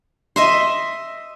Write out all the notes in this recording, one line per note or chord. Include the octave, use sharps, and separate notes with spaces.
D#5 E5 C6